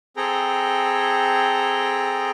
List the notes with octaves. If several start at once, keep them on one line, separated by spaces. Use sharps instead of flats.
C4 G#4 A4 G5 A#5